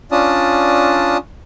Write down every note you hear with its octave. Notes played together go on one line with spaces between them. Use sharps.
C#4 D4 F4 D5 A5 D#6